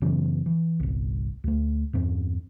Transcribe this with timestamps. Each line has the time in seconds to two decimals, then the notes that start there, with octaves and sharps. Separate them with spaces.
0.02 F#2 C#3 E3 B3
0.46 E3
0.80 G1 C2
1.44 D2 A3
1.93 E2 G2 C4